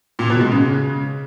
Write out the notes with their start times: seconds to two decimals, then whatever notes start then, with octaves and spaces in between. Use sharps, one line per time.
0.19 A#2
0.30 B2
0.41 G#3
0.52 C#3